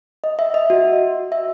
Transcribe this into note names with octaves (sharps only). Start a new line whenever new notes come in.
D#5
E5
D#5
F#4
E5